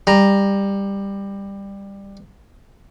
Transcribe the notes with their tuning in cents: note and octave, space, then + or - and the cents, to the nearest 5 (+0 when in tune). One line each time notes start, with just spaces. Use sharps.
G3 +15 A#5 +0